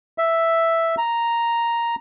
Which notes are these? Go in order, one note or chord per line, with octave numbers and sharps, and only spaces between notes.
E5
A#5